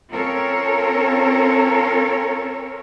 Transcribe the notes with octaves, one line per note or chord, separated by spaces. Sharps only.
C4 C#4 F4 A4 A#4 C#5